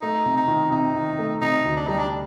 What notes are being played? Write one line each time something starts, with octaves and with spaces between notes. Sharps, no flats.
A3 D#4
C3
D#4
D#3
C3 D#4
D#3
A3
C3 D#4
D2
D4
G3 D#4
D4